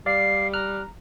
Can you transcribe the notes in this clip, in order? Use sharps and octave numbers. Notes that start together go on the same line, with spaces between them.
G3 D5 F5 C7
A#5 F6 F#6